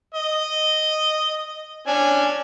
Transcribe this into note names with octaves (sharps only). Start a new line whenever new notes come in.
D#5
C#4 D4 G#5